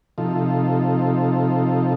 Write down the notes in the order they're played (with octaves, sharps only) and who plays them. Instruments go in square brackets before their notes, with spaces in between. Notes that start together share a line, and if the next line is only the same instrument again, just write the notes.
[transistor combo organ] C3 F3 D#4 F4 A4